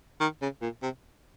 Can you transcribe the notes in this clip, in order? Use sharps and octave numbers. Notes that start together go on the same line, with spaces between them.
D#3
C#3
A#2
C3